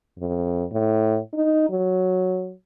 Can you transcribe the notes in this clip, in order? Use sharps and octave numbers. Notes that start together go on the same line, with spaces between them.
F2
A2
D#4
F#3